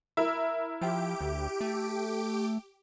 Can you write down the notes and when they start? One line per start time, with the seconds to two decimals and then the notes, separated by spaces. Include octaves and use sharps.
0.17 E4 A#4
0.81 F3 G4 D7
1.21 D2
1.61 A3